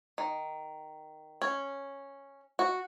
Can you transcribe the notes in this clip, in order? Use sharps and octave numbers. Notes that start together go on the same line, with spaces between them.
D#3
C#4
F#4